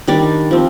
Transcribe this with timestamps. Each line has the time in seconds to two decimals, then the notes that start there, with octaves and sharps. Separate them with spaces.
0.07 D#3 G3 D4 D5
0.51 F3 C4